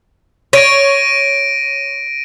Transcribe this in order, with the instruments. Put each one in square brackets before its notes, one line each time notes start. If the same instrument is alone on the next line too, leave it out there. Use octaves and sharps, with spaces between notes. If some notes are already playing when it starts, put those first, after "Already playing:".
[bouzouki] C#5 [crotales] A#6 D7 D#7